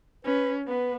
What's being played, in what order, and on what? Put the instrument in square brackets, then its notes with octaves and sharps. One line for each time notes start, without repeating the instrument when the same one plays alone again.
[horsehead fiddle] C#4 [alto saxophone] B4
[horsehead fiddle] B3 [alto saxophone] B4